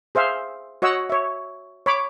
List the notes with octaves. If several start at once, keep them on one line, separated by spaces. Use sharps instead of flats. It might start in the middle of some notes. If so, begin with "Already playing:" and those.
G#4 C5 E5 F5
F#4 C#5 D#5 F#5 E6
C#5 E5
C#5 B5 D6